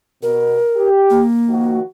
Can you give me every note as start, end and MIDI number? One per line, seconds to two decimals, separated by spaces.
0.23 0.57 47
0.23 0.88 70
0.76 1.22 67
1.10 1.77 58
1.49 1.82 51
1.49 1.82 53
1.49 1.82 66